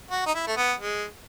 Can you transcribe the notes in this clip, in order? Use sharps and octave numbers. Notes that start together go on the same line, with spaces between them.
F#4
D#4
E4
A3
B3
G#3